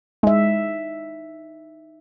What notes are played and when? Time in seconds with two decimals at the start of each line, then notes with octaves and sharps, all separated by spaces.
0.23 G#3 D#4 E5